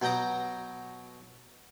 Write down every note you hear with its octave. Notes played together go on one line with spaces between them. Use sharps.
B2 F#3 G5 A#5 D#6